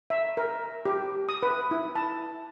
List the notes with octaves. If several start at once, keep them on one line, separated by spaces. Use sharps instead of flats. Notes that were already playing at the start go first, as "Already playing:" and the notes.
E5
A#4
G4
D#6
B4
E4
A5